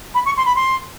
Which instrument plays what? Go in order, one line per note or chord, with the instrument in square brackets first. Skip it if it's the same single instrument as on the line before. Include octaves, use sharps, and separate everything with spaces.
[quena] B5
C#6
C6
B5
C6